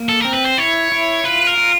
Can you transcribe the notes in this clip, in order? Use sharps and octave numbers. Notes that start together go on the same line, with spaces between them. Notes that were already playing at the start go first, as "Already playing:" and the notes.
Already playing: A#3
A4
C4 A#4
B4
C5
E4 C#5
E4
F4 B4
A#4
F4